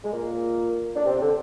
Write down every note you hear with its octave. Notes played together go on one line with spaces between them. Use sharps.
G#3
A#2 A#3
D4
C3 C4
D3 D4